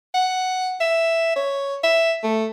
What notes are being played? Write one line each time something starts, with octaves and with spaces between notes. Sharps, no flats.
F#5
E5
C#5
E5
A3